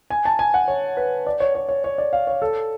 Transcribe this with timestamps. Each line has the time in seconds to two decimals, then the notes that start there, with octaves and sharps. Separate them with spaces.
0.10 G#5
0.25 A5
0.39 G#5
0.54 F#5
0.68 C#5
0.97 B4
1.27 D5
1.40 C#5
1.55 C#5
1.69 C#5
1.84 C#5
1.98 D5
2.13 F5
2.27 C#5
2.42 A4